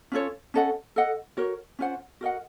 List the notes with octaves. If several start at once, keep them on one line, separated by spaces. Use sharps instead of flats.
C#4 F4 A4 C#5
C#4 A4 D#5 F#5
A4 D#5 F#5
F#4 A#4 C#5
C#4 F4 C5 F#5
F#4 A#4 D#5 F#5